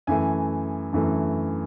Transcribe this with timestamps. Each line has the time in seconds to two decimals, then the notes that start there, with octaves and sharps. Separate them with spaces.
0.07 F#2 E3 A3 G#5
0.93 F#2 E3 A3